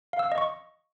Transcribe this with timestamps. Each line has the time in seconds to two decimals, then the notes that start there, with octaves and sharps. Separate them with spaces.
0.13 F5
0.19 E6
0.25 F5
0.32 D#5
0.38 C#6